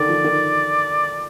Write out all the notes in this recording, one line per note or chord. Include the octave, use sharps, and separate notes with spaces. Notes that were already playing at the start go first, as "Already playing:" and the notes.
Already playing: D3 D#3 D5
F3
D#3